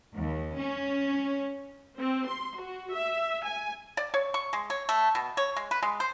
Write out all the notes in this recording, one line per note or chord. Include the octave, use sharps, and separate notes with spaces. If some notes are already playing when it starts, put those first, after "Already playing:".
D#2
C#4
C4
C6
F#4
E5
G#5
D5
C#5
C#6
G#3
C#5
A3
B2
C#5
G#3
B4
G#3
C5